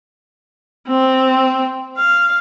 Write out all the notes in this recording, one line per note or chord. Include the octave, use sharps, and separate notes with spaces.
C4
F5